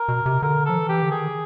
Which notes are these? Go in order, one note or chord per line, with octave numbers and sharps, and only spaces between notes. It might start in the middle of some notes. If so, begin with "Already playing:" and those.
Already playing: A#4
B2
C3
D3 A#4
F3 A4
E3
G4
D3
D#3 G#4